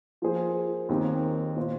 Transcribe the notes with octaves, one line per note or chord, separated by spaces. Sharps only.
F3 A#3 G#4 C5
D#2 D#3 C4 D#4
A#2 A#3 F4 C5